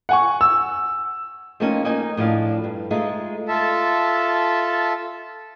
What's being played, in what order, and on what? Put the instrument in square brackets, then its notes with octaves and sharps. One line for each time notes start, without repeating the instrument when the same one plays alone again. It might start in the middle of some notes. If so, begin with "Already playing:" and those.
[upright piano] F#5 G#5 C#6
E6
[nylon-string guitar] F3 A3 A#3 C4 C#4 D#4
A#3 D#4 A#4 G#5
A2 F3 D4 D5 F5
G2
G#3 A3 D#4 F4
[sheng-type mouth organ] F4 A4 E5 A5